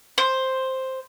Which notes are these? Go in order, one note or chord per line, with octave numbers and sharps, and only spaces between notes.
C5